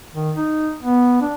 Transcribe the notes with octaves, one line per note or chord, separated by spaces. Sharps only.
D#3
D#4
B3
D4